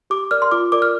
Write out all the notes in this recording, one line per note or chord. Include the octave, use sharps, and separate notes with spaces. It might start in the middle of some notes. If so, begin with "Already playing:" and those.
G4 D6
A#4 D5 F6
C6
F4 D6
A#4 D5 D6
F6